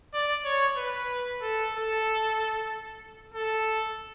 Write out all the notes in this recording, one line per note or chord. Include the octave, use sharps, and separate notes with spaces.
D5
C#5
B4
A4
A4
A4